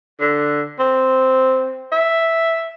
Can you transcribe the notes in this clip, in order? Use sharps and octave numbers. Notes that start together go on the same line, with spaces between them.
D3
C4
E5